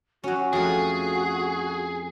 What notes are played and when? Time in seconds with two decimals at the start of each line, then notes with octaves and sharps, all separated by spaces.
0.24 F#3 C#4 F#4
0.53 F2 A3 F#4 G#4